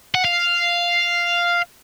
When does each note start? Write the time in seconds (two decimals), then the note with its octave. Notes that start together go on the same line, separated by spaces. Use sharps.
0.15 F#5
0.25 F5